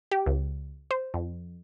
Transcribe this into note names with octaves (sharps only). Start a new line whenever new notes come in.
G4
C#2
C5
F2